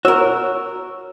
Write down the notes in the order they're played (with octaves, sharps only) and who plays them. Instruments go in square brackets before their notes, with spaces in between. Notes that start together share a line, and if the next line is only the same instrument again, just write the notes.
[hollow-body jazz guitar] F#4 A#4 [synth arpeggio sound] C#5 E6